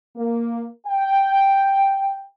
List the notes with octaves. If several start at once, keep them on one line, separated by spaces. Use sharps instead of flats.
A#3
G5